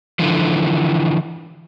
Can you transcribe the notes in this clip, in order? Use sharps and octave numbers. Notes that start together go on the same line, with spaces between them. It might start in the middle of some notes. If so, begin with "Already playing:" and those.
D3 E3 F3